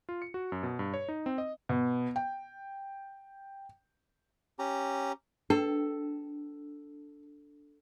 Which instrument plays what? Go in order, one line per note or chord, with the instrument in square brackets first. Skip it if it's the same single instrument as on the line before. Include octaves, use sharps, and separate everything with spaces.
[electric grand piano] F4
C#7
F#4
F#2
B2
G2
C#5
D#4
C4
D#5
[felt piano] B2
G5
[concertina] C#4 G4 A#5
[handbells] D4 [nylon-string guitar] A4